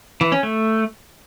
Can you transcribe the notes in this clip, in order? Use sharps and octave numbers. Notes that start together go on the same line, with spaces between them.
E3
C#4
A3